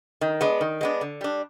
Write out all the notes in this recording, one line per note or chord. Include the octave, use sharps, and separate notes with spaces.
D#3
G#3 B3 D4
D#3
G#3 B3 D4
D3
G3 D4